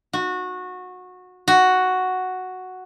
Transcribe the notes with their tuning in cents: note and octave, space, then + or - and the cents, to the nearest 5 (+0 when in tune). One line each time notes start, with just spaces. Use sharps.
F#4 -20
F#4 +0